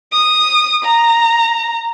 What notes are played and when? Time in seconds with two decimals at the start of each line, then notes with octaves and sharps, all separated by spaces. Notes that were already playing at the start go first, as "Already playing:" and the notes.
0.12 D#6
0.84 A#5